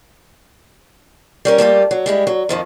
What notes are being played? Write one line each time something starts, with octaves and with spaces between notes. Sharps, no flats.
G3 C#4 A#4
G3 A3 A#3 F4
F#3
G3 G#3 E4
F#3
F2 D#3 F3